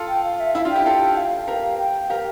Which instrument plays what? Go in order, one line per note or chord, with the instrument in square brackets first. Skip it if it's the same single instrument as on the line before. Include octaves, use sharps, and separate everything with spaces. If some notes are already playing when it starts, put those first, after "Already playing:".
Already playing: [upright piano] F4 A4
[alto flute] G5
F5
E5
[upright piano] E4 [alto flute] F5
[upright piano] D4 F4
[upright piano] E4 G4 [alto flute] G5
[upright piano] G4
F4 A4
[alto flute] F5
[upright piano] G4 A#4
[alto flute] G5
[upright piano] G4 A#4 [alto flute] F5